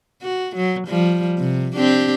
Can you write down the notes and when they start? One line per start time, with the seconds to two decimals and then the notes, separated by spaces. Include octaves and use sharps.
0.22 F#4
0.56 F#3
0.88 F3 G3
1.39 C3
1.76 C4 D4 G4